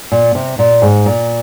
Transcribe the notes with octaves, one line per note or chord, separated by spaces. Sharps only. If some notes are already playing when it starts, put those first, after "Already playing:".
A#2
C3
A#2
G#2
A#2